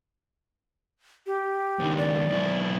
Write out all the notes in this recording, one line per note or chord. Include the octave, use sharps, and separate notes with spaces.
G4
C#2 D#3
D5
B1 E4